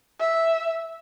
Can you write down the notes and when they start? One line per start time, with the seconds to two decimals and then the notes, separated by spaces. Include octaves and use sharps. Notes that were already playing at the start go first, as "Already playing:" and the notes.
0.20 E5